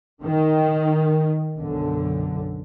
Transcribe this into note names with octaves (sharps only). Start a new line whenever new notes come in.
D#3
B1 F#2 D3